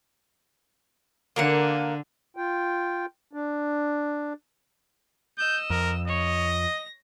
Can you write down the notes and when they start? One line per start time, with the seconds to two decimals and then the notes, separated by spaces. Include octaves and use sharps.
1.36 D3 A#3 A#4 F#5
2.37 F4 G5
3.33 D4
5.38 D#5 E6 G6
5.70 F2 A#4
6.08 C#5 D#5
6.47 A#6